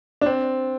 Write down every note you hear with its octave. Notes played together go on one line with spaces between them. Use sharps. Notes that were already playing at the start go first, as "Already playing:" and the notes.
D4
C4